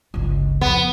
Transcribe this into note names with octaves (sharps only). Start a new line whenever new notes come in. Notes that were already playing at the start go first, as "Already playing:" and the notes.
G1 C#2
F2 B3